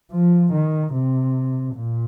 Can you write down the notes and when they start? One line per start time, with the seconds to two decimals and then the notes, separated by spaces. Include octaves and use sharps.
0.12 F3
0.53 D#3
0.93 C3
1.75 A#2